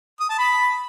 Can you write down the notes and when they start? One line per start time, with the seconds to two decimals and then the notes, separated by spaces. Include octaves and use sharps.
0.20 D#6
0.29 A5
0.39 B5